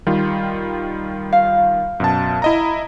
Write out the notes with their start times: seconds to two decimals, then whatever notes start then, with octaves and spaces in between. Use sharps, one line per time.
0.06 D#3 G3 F4
1.32 F5
2.00 F#2 B2 A5
2.42 E4 D#5 A#5